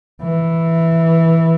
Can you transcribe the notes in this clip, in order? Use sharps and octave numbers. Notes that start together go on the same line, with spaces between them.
E3